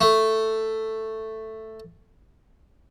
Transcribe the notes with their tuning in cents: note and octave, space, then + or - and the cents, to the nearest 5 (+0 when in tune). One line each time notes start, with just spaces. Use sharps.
A3 +5